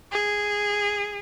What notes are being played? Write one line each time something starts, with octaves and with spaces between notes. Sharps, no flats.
G#4